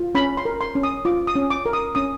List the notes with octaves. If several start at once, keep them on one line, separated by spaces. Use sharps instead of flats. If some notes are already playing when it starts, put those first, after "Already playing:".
Already playing: F4
C#4 B5
C6
A#4
C6
C#4
D#6
F4 D6
D#6
C#4
D6
A#4
D#6
C#4 D#6